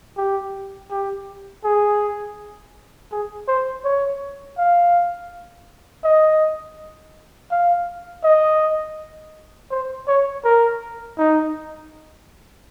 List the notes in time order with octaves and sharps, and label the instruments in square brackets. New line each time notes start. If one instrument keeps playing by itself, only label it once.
[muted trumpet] G4
G4
G#4
G#4
C5
C#5
F5
D#5
F5
D#5
C5
C#5
A#4
D#4